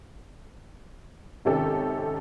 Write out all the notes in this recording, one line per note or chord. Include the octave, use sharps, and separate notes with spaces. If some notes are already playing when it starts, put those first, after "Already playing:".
G#1 C3 D#3 C#4 G4 A4